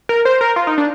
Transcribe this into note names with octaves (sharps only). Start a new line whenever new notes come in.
A#4
C5
A#4
F4
D#4
D4